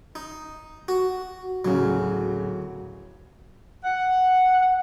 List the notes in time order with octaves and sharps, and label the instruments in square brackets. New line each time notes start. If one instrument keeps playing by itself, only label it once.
[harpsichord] D#4
F#4
[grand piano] D1 C#3 [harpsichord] F#3
[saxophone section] F#5